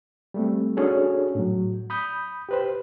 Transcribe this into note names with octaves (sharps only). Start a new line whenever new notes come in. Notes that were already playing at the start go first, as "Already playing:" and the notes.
G3 A3 C4
C#4 D4 F#4 G#4 A4 C#5
A2 F#3
B5 D#6 G6
G4 B4 C5